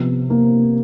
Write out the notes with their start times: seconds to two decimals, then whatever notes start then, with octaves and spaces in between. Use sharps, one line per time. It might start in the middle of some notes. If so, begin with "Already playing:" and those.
Already playing: C3 F3 B3
0.30 A#3